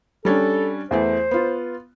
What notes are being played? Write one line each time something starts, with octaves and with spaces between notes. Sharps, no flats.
G3 C#4 D4 A4
E2 E3 A3 C5
B3 F4